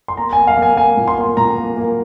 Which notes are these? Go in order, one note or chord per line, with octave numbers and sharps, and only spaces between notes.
C6
A#3 A#5
A#3 G#5
F5
A#3 G#5
A#3 G#5
A#2
C6
A#3
A#2 A#5
A#3
A#3